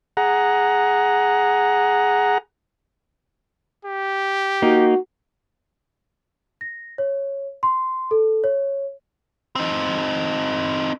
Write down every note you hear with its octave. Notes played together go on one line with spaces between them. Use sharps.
G#4 F#5 A#5
G4
A#3 D#4 F#4
A#6
C#5
C6
A4
C#5
C4 D#4